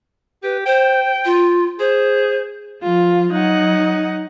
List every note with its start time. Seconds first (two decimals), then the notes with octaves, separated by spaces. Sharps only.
0.43 G4 B4
0.66 C5 G5
1.25 F4
1.80 G#4 C5
2.83 F3 F4
3.33 F#3 D#4 D#5 F#5